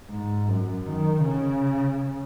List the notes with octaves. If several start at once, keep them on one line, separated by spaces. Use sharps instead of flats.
G#2
F#2
D#3
C#3